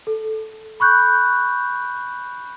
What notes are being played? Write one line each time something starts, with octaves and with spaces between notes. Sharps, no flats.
A4
B5 C#6 F#6 G6